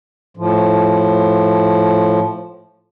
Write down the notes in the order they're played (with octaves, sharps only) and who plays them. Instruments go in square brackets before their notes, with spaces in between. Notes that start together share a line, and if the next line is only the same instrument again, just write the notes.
[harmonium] A2 F3